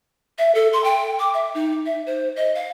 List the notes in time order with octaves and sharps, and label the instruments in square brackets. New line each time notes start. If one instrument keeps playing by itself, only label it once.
[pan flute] E5
A4
C6
G5
D6
E5
D#4
E5
C5
D#5
F5